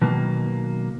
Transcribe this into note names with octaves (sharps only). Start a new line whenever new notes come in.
B2 D#3 F#3 A#3